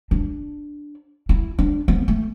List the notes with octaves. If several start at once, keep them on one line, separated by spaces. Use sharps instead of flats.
D4
E4
D4
B3
A3